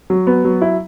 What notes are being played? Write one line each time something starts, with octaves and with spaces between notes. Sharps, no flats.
F#3
B3
F#3
E4